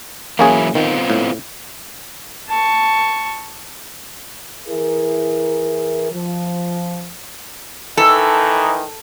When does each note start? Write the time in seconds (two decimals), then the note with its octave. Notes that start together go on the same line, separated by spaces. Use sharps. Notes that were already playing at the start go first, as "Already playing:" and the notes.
0.39 E3 F#3 A#3 C#4 E4 G#4
0.75 D#3 B3 C4 F4
1.10 A2
2.50 A5 C#6
4.68 E3 E4 G#4 A#4
6.12 F3
7.97 D#3 E3 D#4 A4